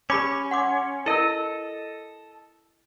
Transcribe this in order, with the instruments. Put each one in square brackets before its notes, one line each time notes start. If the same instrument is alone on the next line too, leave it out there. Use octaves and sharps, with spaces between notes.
[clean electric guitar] C#4 [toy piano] G4 B5 D6
[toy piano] F#5 C6 D6
[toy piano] E4 A#4 [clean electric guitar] A4 D#5